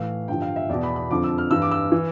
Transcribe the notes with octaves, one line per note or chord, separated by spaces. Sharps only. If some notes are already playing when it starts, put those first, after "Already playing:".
Already playing: A2 E3 F5
G2 D3 F3 G5
F5
E5
E2 B2 D5
B5
B5
F2 D3 F3 D6
E6
F6
G2 E3 E6
D6
E6
E3